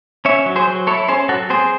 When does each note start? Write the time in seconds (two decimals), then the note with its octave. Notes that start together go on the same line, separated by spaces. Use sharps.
0.25 C#4 C#5 E5
0.46 F#3
0.56 G#4 C5
0.67 F#3
0.87 E4 A4 C#5
1.08 C#4 G#4 C5
1.29 F#3 F#4 A4
1.50 C4 G#4 C5